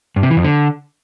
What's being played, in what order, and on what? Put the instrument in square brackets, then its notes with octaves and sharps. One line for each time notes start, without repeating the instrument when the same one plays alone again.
[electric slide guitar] G2
C3
E3
F2
D3